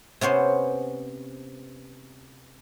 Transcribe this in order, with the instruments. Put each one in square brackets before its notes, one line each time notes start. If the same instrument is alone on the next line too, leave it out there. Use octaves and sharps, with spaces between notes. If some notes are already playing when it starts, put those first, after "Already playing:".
[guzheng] C3 B3 C#4 C5